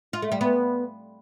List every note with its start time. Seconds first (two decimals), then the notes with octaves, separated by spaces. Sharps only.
0.13 F4
0.22 A3
0.32 G3
0.41 B3